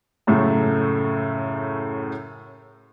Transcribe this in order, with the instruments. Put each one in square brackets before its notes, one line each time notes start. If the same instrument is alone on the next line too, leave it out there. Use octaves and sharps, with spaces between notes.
[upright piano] F#2 A2 C#3 A3